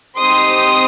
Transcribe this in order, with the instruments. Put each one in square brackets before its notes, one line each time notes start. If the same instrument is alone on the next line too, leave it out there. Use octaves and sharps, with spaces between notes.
[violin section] C4 D#4 G4 C6 D#6